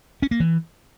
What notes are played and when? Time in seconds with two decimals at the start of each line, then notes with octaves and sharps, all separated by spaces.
0.22 C#4
0.31 A#3
0.40 E3